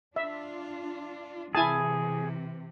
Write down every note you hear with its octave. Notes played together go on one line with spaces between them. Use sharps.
D4 F4 E5
C3 E3 E4 G#4 G#5 A5